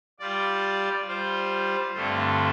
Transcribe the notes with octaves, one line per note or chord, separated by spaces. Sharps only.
G3 F4 D5
G3 F4 C5
G2 D3 A3 C4 F4